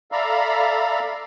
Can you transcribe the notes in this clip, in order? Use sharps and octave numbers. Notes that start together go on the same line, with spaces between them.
A4 D5 E5 F5 A#5 B5